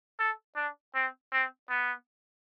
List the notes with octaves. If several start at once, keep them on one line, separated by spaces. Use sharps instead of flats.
A4
D4
C4
C4
B3